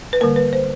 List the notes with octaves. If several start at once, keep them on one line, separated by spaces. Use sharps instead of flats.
B4
D3 G3 A#3 A#4
B4
C5